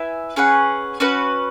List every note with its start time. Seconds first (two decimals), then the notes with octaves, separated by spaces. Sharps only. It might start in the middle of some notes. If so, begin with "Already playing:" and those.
Already playing: E4 B4 E5 G#5
0.36 C#4 G#4 B4 F#5
1.00 C#4 F#4 B4